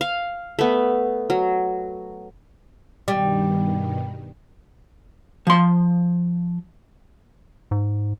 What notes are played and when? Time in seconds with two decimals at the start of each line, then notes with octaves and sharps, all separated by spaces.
0.01 F5
0.59 A3 B3
1.30 F#3
3.08 G2 B2 D#3 G3
5.47 F3 C6
7.71 G#2